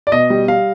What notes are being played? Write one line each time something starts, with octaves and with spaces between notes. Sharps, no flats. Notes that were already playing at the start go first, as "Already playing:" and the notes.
D5
B2 D#5
G3
G3 F5